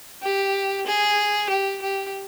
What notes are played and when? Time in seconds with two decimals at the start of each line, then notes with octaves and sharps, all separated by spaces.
0.23 G4
0.87 G#4
1.49 G4
1.81 G4